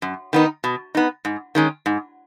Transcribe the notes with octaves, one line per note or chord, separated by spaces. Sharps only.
F#2
D#3 B3 D#4
B2
B3 D#4
G#2
D#3 G#3 C#4
G#2